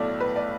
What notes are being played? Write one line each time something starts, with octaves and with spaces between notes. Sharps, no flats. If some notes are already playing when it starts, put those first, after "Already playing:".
Already playing: B1 A2 A3 D5
B4
D5